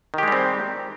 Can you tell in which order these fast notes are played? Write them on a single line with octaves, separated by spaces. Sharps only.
D#3 G4 G#3 G3 C4